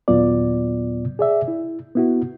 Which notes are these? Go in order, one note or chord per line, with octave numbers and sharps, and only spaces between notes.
D#2 A#2 F#3 B3 F4 D5
G#4 D5 E5
E4
B3 E4 F#4